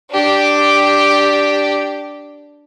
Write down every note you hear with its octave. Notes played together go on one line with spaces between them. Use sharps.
D4 G4